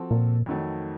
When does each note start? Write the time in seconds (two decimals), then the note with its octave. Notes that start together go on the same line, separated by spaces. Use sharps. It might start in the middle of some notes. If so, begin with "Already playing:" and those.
Already playing: F3 C4 F#4 A4
0.11 A#2
0.46 F2 D#3 F#3 A3